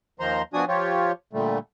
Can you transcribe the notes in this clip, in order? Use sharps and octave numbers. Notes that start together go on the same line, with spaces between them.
D#2 D#3 F3 C5 A#5 C6
B2 F3 D4 F#4 G#5 D#6
F3 F4 G4 C#5
A#2 D3 G3 A3